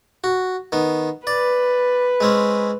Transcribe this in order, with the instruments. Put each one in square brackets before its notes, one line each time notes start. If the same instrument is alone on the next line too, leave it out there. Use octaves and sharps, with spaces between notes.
[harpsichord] F#4
D#3 B3
[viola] B4 [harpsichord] D5
[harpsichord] G#3 C4 C#4